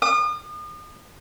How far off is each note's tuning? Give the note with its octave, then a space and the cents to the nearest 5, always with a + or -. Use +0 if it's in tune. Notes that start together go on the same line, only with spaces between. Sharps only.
D#6 -40